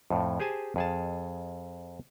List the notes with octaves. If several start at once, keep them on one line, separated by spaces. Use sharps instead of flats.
F2 A2
G4 G#4 C5 G#5 A5
F2 G#4 A5